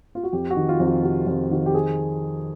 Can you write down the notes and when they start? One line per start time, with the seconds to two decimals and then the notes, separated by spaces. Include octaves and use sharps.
0.15 F4
0.23 F#4
0.33 F2 G4
0.50 F#4
0.56 D#3
0.69 F4
0.80 F2
0.86 F#4
1.03 C3 F#4
1.27 F2 F4
1.51 D#3 F#4
1.66 G4
1.74 G#4